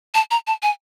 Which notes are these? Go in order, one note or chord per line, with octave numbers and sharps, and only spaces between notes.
A5
A#5
A5
G#5